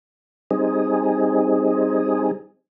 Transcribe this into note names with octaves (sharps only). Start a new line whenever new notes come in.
G3 C4 D#4 G#4